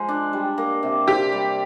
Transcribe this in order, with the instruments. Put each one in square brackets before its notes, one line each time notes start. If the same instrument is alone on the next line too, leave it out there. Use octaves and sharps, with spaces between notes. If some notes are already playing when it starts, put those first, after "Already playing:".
Already playing: [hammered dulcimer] F3 G#3
D4
G3
A#3
C3
[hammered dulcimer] C3 [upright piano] G4
[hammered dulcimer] G3